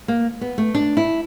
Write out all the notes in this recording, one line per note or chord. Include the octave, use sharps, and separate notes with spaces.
A#3
B3
A3
D4
E4